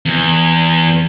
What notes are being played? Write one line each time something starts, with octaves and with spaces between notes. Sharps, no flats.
E2